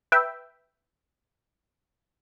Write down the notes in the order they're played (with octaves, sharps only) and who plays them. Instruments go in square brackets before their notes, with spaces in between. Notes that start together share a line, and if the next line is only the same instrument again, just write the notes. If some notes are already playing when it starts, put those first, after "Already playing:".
[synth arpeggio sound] B4 E5 G5